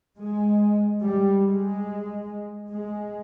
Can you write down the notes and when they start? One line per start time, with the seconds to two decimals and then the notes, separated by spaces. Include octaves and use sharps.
0.17 G#3
1.01 G3
1.44 G#3
2.69 G#3